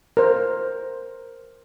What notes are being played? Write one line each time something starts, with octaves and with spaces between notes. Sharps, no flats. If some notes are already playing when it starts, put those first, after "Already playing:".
A#4 C5